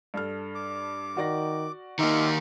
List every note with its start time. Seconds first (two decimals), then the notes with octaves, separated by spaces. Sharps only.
0.14 G2 A4 F6
0.55 D6
1.17 D#3 F#4 D5 A#6
1.99 D#3 A#3 D#4 F4 G4 E5